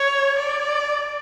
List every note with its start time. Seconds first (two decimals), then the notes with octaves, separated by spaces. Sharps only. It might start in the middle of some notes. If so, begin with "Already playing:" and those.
Already playing: C#5
0.39 D5